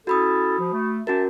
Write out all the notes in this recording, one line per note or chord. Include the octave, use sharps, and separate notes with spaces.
C#4 E4 F#4 A4 B5 D#6
F3
A3
C#4 F#4 A#4 E5 G#5 A5